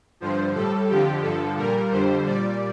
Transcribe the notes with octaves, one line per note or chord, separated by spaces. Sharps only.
G2 D3 F3 C5
A2 G3 A4
F2 D3 F3 G4
G2 D3 F3 A4
A#2 G3 A#4
F2 D3 G3 C5
A#2 G3 D5